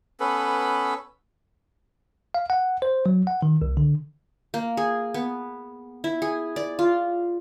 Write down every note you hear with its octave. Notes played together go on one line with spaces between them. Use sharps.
B3 C#4 A4 B4
F5
F#5
C5
F#3
F#5
D#3
C2
D3
A#3
G#4
B3
E4
G#4
D5
F4